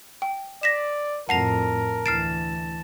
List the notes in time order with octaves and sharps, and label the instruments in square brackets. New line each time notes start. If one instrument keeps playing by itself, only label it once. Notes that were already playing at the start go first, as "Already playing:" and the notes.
[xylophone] G5
[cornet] D5 [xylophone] A#6 B6 E7
[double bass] F2 A2 [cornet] A#4 [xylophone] F#5 C7 F7 [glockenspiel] A5 A#6
[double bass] D2 E3 [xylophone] F6 C7 D7 [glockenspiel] A6 E7